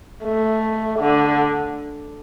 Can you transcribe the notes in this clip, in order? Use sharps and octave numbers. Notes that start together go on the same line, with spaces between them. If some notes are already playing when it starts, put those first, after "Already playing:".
A3
D3